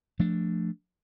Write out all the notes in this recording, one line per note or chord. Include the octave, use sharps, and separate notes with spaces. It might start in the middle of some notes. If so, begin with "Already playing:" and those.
F3 A3 D4